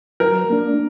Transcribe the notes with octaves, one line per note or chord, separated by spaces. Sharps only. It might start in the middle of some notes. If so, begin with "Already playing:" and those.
F#3 A#4
A#3 D4